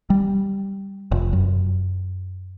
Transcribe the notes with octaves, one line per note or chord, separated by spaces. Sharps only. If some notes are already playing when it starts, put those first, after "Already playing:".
G3
F1
F#2